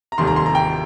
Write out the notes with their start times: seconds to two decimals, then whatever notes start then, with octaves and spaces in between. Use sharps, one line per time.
0.12 A#5
0.18 F1 D#2 D#3 G3 C6
0.27 A#5
0.36 C6
0.46 A#5
0.55 G5